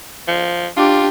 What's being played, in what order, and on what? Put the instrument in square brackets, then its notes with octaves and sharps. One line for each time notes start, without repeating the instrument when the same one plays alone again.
[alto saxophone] F3
[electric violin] D4 G4 [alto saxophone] F4